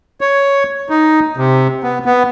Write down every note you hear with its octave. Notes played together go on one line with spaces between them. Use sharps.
C#5
D#4
C3
B3
B3